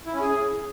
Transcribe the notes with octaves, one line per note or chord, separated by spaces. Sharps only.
E4
C#4
G#4